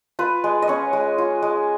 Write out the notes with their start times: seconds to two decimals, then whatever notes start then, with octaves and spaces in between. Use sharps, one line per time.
0.19 F4 B4
0.44 G#3
0.62 D#5
0.68 C#4 C#5
0.93 G#3
1.18 F4
1.42 G#3